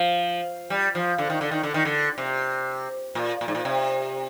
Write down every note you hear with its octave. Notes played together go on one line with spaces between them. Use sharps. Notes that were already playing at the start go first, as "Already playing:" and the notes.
Already playing: F3
G3
F3
D3
D#3
D3
D#3
D3
D#3
D3
C3
A#2
A#2
G#2
A#2
C3